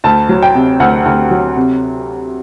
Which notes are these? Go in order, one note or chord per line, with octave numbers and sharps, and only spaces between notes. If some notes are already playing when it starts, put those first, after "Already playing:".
D2 A5
F#3
G5
C3
D2 F#5
D2
F#3
C3